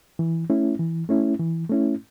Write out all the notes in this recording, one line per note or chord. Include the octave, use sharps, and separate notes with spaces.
E3
A3 C#4 E4
E3
A3 C#4 E4
E3
A3 C#4 E4